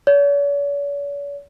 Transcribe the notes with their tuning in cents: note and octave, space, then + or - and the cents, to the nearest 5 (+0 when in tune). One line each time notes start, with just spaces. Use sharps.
C#5 +45